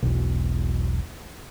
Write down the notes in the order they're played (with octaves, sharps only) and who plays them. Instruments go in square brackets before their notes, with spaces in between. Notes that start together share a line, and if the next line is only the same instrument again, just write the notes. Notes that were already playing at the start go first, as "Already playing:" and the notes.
[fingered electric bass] E1 B1